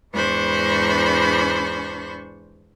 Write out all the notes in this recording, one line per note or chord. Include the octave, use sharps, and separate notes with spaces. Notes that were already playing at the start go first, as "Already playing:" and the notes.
E2 G#2 D4 C5 B5 C#6